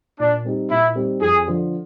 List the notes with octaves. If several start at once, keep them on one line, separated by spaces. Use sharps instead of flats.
A#2 D4
G3 C4 D#4 G4
A#2 E4
G3 C4 D#4 G4
F2 G#4
D3 F3